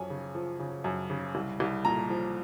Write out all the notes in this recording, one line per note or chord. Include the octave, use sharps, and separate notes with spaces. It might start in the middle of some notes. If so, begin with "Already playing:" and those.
Already playing: F#2 F3 C#5 G#5
C#3
F3
C#3
F#2
C#3
C2
C2
A#2 A#5
F3